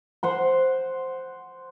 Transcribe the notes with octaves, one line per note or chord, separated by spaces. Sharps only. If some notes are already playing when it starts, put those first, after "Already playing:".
C5 F#5 C6